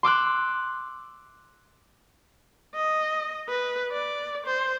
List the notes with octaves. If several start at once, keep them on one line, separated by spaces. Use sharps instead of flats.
C6 D6 E6 F#6
D#5
B4
D5
C5